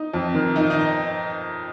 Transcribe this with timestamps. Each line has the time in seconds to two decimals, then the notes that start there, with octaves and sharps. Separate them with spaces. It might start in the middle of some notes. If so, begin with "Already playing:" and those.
Already playing: D#4 D#5
0.14 F2
0.34 D#3
0.56 D#3 D#4 D#5
0.70 D#4 D#5